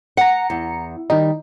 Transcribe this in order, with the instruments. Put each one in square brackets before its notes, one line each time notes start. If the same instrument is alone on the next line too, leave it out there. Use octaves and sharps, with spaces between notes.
[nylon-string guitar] F#5 [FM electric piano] A#5 C#7
[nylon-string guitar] E2
[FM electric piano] D#3 D#4 [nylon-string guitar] G3